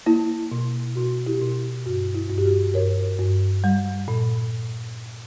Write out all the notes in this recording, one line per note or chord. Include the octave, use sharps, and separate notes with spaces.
A#3 E4
B2
B2 F#4
E4 G4
B2
G2 F#4
E4
G2
G4
F#4
G2 A#4 C#5
G2
G3
A#2